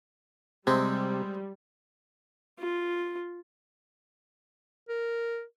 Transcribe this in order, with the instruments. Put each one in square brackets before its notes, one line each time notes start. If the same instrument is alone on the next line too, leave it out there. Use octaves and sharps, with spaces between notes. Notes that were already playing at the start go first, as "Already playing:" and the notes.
[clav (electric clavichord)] C3 [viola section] G3 [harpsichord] G#3 C4
[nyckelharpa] F4
[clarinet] A#4